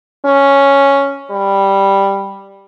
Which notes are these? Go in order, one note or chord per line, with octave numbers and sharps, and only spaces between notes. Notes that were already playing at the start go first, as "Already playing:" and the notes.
C#4
G3